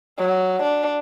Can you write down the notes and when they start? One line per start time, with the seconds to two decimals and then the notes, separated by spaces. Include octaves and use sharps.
0.19 F#3
0.63 D4